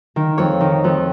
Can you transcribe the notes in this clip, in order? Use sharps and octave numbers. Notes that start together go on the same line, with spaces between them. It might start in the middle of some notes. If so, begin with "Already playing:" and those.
D#3
F2 C#5
D#3
F2